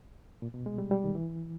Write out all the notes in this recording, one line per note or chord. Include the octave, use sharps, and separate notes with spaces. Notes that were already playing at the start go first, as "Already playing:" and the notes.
A#2
B2
G#3
G3
G3
D#3
E3